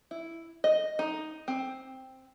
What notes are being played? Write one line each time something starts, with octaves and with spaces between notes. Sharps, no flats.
E4
D#5
D#4
C4